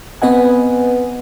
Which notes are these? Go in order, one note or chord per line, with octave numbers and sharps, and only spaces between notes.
B3 C4 B4 D#5 F#5 G#5